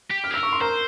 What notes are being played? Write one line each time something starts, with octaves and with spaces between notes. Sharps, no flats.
G4
F6
G#4
A#4 E6
C#6
C6
A#4 C5 A#5